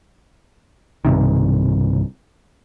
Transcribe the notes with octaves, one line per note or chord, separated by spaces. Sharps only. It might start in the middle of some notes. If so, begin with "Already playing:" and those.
B1 G2 C3 D#3